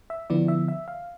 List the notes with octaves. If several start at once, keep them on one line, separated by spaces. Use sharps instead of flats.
E5
D3 F3 B3 E4 D5
E5
E5
F5